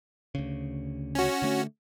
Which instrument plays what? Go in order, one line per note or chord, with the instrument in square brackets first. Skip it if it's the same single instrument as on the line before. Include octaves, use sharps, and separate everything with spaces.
[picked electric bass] D2 C#3
[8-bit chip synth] C#4 F#4
[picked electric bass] D3 A3